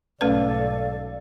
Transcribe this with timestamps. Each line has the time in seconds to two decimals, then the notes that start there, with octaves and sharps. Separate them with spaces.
0.21 B1 G#2 A3 C#4 A4 B4 D5 F5